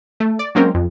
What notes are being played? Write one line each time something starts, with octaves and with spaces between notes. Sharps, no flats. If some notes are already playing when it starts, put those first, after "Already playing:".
A3
D5
F#3 G#3 A#3 C4 C#4 A#4
F2